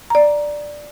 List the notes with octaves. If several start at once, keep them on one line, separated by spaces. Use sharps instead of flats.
D5 A#5